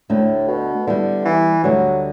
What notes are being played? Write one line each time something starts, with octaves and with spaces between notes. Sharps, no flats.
D2 A2 D3 A3
B2
D3 G3 B3 E4 G4
E3
D2 D3 F#3 G3